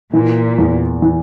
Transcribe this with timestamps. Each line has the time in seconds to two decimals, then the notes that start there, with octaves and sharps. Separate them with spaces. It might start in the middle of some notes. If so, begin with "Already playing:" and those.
0.13 A#2 E3
0.58 E2
1.02 E3